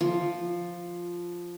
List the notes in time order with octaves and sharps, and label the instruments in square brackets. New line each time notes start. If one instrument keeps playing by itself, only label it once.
[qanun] F3